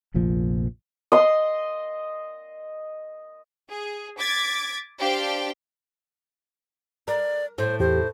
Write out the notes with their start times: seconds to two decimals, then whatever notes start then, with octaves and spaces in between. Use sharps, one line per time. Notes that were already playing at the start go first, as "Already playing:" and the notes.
0.14 F1 A#1 A#2 F3
1.12 D#5 C6
3.70 G#4
4.19 D6 G#6 A6 B6
5.00 D4 G4 C5 F5 G5
7.08 A#4 D5
7.58 A2 C5
7.80 E2 G4 C5